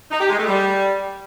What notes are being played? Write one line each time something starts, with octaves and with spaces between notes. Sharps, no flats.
D#4
G4
G#3
A3
G3